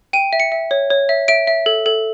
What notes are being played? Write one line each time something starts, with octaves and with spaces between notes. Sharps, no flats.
G5 D#7
E5
C#7
E5
C#5
C#5
E5
E5 D7
E5
A4
A4